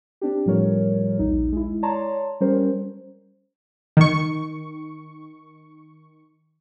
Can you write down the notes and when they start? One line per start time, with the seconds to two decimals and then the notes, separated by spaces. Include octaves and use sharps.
0.22 C4 D4 G4
0.46 A2 F3 G3 A#4 C#5
1.19 A#1 D#2 D#4
1.52 G#3 E4
1.83 C#5 D5 A5 A#5 C6
2.41 G3 C#4 A#4 C5
3.97 D#3 C#6